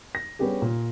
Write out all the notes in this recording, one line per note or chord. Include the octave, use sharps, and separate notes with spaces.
A#6
G3 B3 C#4 D4 G4 G#4
A#2